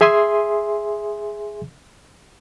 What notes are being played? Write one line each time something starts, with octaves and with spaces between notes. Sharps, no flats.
G#4 E5 G#5 C6 D#6